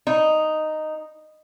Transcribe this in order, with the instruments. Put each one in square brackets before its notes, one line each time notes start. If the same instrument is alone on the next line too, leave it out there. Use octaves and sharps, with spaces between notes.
[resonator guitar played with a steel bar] D#4